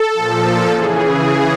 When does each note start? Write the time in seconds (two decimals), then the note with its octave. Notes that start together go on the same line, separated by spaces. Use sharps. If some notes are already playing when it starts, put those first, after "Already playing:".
Already playing: A4
0.14 A#2 F3
0.70 C#3 E3 G#4
0.98 G#4